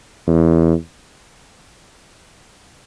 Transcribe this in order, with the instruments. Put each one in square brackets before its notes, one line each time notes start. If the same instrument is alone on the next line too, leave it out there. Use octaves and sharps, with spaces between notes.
[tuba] E2